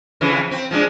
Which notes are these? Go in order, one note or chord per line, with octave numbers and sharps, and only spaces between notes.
F2 C#3 E3
C4
F3 G#3 D4